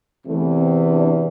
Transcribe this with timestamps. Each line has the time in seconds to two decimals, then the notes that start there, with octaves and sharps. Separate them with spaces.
0.23 E2 C3 E3 A3
0.57 C4
0.90 D4